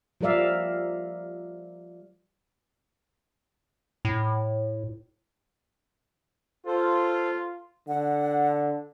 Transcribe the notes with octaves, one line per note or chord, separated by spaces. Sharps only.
F3 G3 A#4 D5 E5 F5
A2
F4 A4 C5
D3 F#5